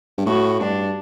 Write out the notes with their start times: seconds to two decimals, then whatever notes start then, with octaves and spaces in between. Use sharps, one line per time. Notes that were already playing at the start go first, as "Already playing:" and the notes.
0.18 G2
0.26 A2 F#4
0.60 G2 D4